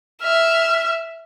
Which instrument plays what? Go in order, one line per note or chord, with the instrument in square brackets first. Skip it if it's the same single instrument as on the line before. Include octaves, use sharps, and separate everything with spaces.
[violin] E5 [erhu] F6